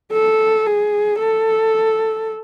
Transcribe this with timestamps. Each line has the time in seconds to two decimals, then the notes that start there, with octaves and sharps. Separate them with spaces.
0.13 A4
0.66 G#4
1.19 A4